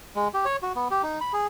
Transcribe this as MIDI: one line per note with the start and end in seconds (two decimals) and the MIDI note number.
0.16 0.28 56
0.34 0.45 67
0.45 0.56 73
0.63 0.73 66
0.76 0.88 59
0.91 1.02 67
1.03 1.20 63
1.21 1.32 83
1.33 1.47 68